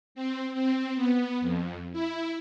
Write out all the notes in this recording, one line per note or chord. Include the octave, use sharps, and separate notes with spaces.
C4
C4
B3
F2
E4